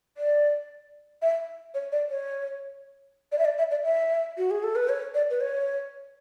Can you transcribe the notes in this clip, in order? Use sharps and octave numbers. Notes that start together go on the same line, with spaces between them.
D5
E5
C#5
D5
C#5
D5
E5
D5
E5
D5
E5
F#4
G#4
A4
B4
C#5
D5
B4
C#5